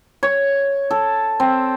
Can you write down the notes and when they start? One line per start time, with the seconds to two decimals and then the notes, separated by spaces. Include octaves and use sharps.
0.23 C#5
0.91 A4
1.40 C4